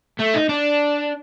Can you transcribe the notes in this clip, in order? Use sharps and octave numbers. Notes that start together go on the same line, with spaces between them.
A3
D#4
D4